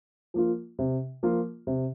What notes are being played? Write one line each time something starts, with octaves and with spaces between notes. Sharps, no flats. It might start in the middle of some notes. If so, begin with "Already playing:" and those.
F3 A#3 F4
C3
F3 A#3 F4
C3